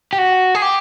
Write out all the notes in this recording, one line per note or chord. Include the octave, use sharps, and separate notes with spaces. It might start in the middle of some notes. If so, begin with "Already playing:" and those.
G4
F#4
G#4
G4